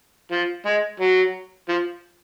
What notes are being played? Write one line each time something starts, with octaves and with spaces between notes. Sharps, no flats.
F3
G#3
F#3
F3